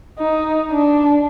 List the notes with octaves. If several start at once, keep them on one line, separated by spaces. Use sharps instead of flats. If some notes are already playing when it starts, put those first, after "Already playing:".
D#4
D4